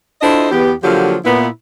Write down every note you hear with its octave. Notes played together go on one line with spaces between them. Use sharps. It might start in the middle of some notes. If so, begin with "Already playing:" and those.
D4 E4 F4 A4 C5 D#5
E2 B3 G4
D3 F3 F#3 A#3 F4 G4
A#2 B3 E4